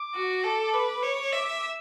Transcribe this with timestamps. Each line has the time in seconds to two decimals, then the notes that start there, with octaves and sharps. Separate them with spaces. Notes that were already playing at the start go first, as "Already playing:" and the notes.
Already playing: D6
0.15 F#4
0.43 A4
0.74 B4 D6
1.03 C#5
1.33 E5